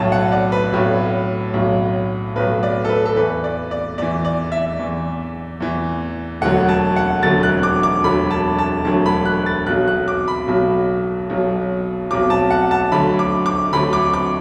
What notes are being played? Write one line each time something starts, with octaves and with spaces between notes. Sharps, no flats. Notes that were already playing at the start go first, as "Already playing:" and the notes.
Already playing: B1 A2 F#3 A5
F#5
D5
B4
B1 A2 F#3
B1 A2 F#3
B1 A2 F#3 B4
D5
A4
B4
A4
E2 E3 B4
D5
D5
E2 E3 D5
D5
E5
E2 E3
E2 E3
E1 D2 D3 F#3 F#5
A5
F#5
E1 D2 D3 F#3 A6
F#6
D6
D6
E1 D2 D3 F#3 B5
A5
A5
E1 D2 D3 F#3 A5
B5
F#6
A6
B1 B2 F#3 F#6
F#6
D6
B5
B1 B2 F#3
B1 B2 F#3
B1 B2 F#3 D6
A5
F#5
A5
D2 D3 F#3 B5
D6
D6
D2 D3 F#3 B5
D6
D6